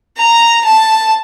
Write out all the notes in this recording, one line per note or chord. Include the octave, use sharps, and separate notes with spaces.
A#5
A5